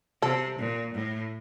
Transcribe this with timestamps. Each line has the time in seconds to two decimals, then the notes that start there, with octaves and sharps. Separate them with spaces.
0.22 C3 A4
0.58 A#2
0.94 A2